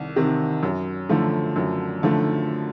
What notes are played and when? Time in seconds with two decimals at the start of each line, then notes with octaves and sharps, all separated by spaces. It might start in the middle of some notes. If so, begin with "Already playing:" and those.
Already playing: C2 D#3
0.16 C3 D#3
0.63 F#2
1.09 D3 F3 A3
1.56 F#2
2.03 D3 F3 A3